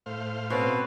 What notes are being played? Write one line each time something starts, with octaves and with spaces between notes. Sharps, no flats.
A2 C5 F5
B2 C4 C#4 B4